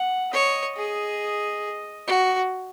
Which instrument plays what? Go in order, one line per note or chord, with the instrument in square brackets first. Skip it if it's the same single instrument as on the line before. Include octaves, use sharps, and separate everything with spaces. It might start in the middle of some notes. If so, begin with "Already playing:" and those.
Already playing: [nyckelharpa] F#5
[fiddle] C#5 [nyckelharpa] D#5
[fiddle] G#4 [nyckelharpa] D#5
[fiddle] F#4